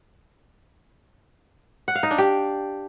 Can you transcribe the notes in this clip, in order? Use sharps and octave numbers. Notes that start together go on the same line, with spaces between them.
F#5
F5
D#4
D4
G4